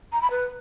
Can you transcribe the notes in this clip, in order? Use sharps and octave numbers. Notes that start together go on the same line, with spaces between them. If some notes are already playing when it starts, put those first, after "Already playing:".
A#5
B5
B4